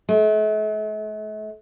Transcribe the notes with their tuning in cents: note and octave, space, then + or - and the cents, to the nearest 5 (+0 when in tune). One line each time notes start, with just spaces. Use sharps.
A3 -45